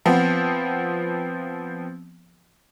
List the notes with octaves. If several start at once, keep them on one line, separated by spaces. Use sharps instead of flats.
F3 B3 C4